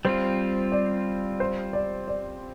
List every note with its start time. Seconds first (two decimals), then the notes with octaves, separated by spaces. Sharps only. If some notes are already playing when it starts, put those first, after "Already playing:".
0.05 G3 C4 F4 C5
0.72 D5
1.40 C5
1.73 D5
2.08 D5